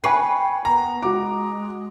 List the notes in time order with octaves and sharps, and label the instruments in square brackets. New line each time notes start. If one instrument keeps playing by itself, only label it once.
[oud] B4 [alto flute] G5 [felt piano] G#5 C#6 C7
[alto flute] B3 [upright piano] A#5
[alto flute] G#3 [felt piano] F#4 D6